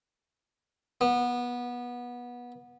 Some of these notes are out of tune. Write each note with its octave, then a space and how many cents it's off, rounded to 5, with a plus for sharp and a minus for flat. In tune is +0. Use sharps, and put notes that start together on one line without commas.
B3 -20